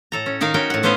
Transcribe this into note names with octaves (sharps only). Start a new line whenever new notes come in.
A2 A4 A#5
C#4
D#3 D#4 A#4 F5
C#4 F#4 A#4 G5
A2 F#5
A3 B3 C#4 C5 D#5 F5